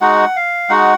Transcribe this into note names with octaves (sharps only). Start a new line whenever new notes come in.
G#3 D#4 F#4 F#5
F5
G#3 D#4 F#4 F#5